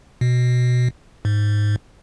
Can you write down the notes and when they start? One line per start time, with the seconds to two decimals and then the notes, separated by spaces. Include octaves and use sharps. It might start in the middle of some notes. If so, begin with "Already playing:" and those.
0.21 B2
1.25 G#2